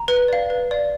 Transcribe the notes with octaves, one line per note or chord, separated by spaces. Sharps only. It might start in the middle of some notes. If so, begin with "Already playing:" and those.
Already playing: A#5
B4
D5 F5
B4
D5 F5